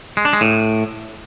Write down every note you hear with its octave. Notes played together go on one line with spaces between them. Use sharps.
G#3
D4
G#3
A2